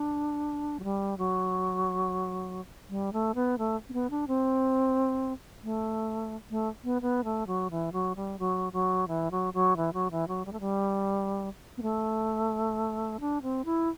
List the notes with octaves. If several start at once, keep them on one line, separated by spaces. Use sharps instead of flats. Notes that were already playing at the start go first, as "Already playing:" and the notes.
Already playing: D4
F#3
G3
F#3
G3
A3
B3
A3
C4
B3
D4
C4
A3
A3
B3
B3
A3
F#3
E3
F#3
G3
F#3
F#3
E3
F#3
F#3
E3
F#3
E3
F#3
G3
A3
G3
B3
A3
D4
C4
E4